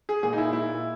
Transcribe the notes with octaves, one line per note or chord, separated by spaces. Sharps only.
G#4
A#2 G#4
D#4
E4
A#2 E4